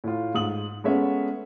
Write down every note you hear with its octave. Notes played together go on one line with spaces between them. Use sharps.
A2 F4
G#2 D#6 F#7
G#3 A3 B3 C#4 E5